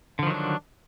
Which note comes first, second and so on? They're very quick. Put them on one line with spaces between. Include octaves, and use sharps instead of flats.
D3 F3 D#3 F#3 D4